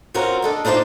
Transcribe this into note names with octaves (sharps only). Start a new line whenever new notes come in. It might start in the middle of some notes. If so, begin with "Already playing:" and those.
C4 C#4 F4 F#4 A#4
D4 A4 D#5
D4 D#4 F4 C5 D5 E5